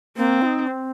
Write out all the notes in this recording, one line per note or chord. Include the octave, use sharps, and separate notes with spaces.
A#3 C4
F4
D#4
C4